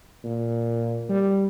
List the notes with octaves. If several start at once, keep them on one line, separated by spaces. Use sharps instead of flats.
A#2
G3